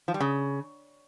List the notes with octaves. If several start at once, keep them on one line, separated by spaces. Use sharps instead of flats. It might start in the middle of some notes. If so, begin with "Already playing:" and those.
F3
G3
C#3